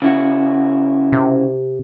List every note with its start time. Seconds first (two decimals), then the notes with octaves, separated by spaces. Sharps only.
0.02 C#3 E4 F#4
1.12 C3